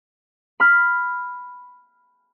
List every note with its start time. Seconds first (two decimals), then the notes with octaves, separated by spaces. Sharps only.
0.60 B5 F6